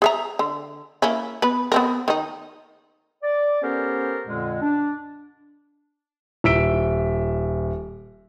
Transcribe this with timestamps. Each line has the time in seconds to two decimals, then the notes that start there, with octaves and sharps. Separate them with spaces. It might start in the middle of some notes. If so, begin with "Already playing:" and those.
0.02 G#4 E5 A#5
0.39 D3
1.02 A#3 C#4 E4
1.42 B3 B4
1.72 B3 C4 A#4
2.08 D#3 D#4
3.23 D5
3.62 B3 C#4 G4 A4 A#4 C5
4.27 F2 A#2 D3 G#3
4.62 D4
6.44 D#1 E5 E6 B6 D7 G7